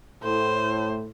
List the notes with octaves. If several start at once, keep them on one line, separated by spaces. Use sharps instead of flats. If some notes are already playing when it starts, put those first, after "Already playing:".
A2 C5